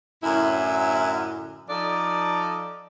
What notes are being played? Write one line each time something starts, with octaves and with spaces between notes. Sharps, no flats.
F#2 A2 D3 E4
F3 D#4 A4 D5